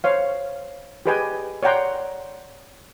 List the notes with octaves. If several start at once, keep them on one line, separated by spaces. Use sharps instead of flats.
C5 C#5 F5
G4 G#4 B4 D#5 G5 G#5
C#5 D5 F#5 G5 A#5 C6